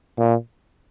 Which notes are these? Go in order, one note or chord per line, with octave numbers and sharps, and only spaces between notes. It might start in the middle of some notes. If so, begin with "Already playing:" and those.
A#2